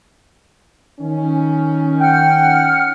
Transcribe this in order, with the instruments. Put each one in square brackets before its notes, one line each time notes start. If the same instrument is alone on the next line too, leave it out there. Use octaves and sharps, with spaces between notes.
[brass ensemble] D#3 C#4
[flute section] F#5 F6 [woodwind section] G5